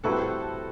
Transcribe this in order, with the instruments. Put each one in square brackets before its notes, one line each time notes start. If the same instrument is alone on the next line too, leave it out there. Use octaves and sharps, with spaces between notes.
[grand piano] A2 G3 C4 E4 B4 [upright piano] F#4 A4